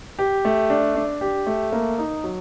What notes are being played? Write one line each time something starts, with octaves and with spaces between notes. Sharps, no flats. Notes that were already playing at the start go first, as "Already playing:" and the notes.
G4
A3
D4
D4
G4
A3
A#3
D#4
F#3